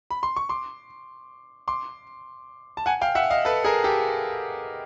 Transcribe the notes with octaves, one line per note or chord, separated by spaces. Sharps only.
B5
C6
C#6
C6 D6
C6 D6
A5
F#5 G#5
F5 G5
E5 F#5
D#5 F5
A4 B4
G#4 A#4
G4 A4